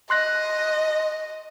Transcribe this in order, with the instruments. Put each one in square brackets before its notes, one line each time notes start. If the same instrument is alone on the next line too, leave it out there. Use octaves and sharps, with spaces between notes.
[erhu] D#5 [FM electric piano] C6 F#6 A#6